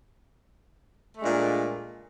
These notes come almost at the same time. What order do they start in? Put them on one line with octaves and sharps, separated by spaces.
A3 G#3 D4 A#2